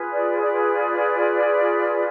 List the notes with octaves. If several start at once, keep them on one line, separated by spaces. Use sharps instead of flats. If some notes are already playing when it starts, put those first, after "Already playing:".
Already playing: F4 G#4 B4
D5
D5